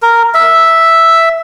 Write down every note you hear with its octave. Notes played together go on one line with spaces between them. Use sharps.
A#4
E5